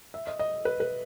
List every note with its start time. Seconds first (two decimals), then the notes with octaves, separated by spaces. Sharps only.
0.14 E5
0.27 D#5
0.39 D#5
0.65 B4
0.80 B4